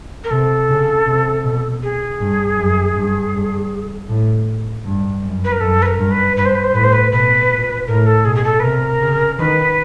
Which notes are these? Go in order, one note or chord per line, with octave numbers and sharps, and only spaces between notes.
A#4
C3 A4
C#3
C3
B2
G#4
G2
F#2
G2
G2
A2
G2
F#2
B4
A#4
F#2 A4
B4
A#4
G2
B4
G2 B4
C5
B4
C5
A2 B4
C5
B4
B2 B4
A#2
A2 A#4
A4
B2 G#4
G#4
A4
B4
C3 A#4
C#3
D#3 B4